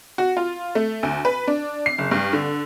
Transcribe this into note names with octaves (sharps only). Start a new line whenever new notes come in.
F#4
F4
A3
D2
B4
D4
C7
F#1
G2
D3